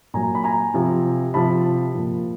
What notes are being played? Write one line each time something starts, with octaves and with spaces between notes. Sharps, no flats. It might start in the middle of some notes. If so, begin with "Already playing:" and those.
A#2 F#3 G#5 A#5
B5
G#5 A#5
C3 F3
C3 F3 A5 B5
A#2 F3